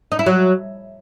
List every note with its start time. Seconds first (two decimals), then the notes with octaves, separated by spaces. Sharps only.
0.12 D#4
0.19 E4
0.26 F#3